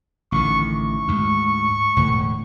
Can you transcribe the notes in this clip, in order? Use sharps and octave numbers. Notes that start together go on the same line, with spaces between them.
A1 D3 D#3 C#6
C#6
D2 G#2
E1 A2 D3